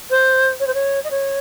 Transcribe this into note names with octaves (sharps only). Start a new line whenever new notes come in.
C5
C#5
C5
C#5
D#5
C#5